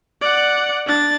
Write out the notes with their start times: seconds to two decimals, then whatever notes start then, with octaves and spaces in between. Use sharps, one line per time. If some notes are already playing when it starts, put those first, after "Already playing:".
0.21 D5 F#5
0.87 D4 A6